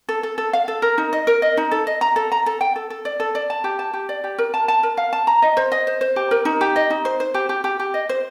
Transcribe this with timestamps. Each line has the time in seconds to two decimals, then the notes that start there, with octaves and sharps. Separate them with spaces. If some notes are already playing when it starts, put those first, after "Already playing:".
0.09 A4
0.23 A4
0.38 A4
0.53 F5
0.68 A4
0.82 A#4
0.98 D#4
1.13 D#5
1.27 A#4
1.42 D#5
1.57 D#4
1.71 A4
1.87 D#5
2.01 A#5
2.16 A4
2.32 A#5
2.46 A4
2.61 G5
2.76 A4
2.90 A4
3.05 D5
3.20 A4
3.35 D5
3.50 A5
3.64 G4
3.79 A5
3.93 G4
4.09 D5
4.24 G4
4.38 A#4
4.54 A5
4.68 A5
4.83 A#4
4.97 F5
5.13 A5
5.27 A#5
5.42 D#5
5.57 C5
5.72 D#5
5.87 C5
6.01 C5
6.16 G4
6.31 A#4
6.45 D#4
6.61 G4
6.76 D#5
6.90 D#4
7.05 C5
7.20 C5
7.34 G4
7.49 G4
7.64 G4
7.79 G4
7.94 D#5
8.09 C5